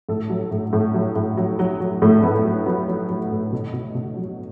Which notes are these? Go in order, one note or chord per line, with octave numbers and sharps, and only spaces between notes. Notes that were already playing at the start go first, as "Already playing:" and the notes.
A2 A4
F#3
A2
A2
F#3
A2
F#3
F#3
F#3
A2 A3
A2 B3
F#3
F#3 B3
F#3
F#3
A2
B2
B2
B2
F#3